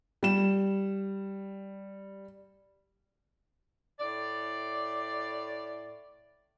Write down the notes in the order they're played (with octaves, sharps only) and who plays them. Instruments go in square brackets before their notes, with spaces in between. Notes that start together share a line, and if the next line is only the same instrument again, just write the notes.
[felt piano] G3 E7
[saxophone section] A2 D5